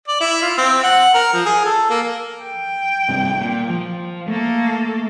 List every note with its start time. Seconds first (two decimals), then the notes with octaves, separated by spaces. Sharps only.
0.08 D5
0.20 E4
0.42 F4
0.58 C4
0.83 F#5
1.14 A#4
1.33 F3
1.46 G#4
1.66 A4
1.90 A#3
2.43 G5
3.09 G#1 G2 C3
3.41 A#2
3.70 F3
4.28 A3 A#3 A4